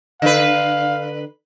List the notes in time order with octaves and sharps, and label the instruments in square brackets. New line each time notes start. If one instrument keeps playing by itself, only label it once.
[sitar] D3 B4 [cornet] F5